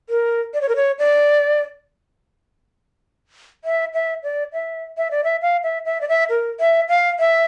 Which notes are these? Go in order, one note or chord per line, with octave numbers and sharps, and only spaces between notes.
A#4
D5
C#5
A#4
C#5
D5
E5
E5
D5
E5
E5
D5
E5
F5
E5
E5
D5
E5
A#4
E5
F5
E5